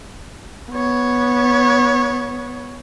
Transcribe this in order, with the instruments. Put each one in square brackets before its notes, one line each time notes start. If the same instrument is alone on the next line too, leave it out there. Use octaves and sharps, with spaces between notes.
[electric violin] B3 C#5